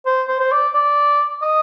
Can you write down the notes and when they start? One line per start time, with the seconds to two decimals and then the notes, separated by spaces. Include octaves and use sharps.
0.06 C5
0.28 C5
0.40 C5
0.52 D5
0.74 D5
1.43 D#5